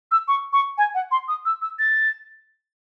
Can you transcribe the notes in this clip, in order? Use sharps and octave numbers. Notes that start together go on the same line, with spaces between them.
E6
C#6
C#6
G#5
F#5
C6
D#6
E6
E6
A6